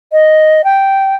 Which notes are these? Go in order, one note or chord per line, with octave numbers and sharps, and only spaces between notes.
D#5
G5